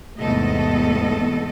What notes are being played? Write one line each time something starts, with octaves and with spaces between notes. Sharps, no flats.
E2 G#2 C3 A3 A4 D#5